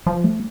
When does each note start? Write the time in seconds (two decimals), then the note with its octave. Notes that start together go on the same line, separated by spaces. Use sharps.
0.07 F3
0.24 A3